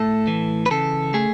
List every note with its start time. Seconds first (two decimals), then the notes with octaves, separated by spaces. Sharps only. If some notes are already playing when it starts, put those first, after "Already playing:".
Already playing: A2 A3 A4
0.27 E3
0.66 B4
0.71 C#3 A4
1.14 A3 G#4